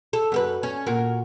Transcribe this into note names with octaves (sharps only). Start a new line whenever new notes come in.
A4
F#2 A4 B4
C#4
A#2 F#4 A#4